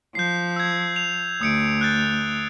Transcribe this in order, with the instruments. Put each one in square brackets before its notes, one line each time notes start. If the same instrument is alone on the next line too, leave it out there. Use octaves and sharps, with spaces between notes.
[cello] F3 [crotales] G6 C7
[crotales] E6 G#6
F7
[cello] D2 [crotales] D#6 C#7 D7
[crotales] F#6 G6 A6